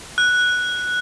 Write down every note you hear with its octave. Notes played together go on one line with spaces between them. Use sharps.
F#6